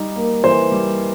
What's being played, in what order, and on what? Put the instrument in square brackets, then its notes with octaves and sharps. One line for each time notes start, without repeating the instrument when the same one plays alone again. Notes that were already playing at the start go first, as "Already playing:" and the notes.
Already playing: [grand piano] G3 D#4
A#3
[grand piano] E3 [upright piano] C5
[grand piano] G3